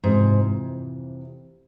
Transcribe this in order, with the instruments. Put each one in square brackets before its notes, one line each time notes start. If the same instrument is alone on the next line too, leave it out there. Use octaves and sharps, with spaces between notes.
[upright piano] F2 C3 E3 G3 [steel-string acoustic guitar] G#2